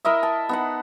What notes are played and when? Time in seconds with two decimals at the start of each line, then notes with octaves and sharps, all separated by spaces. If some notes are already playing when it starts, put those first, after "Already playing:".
0.05 E4 A#4 D#5 E5
0.23 A5
0.49 B3 D#4 F#5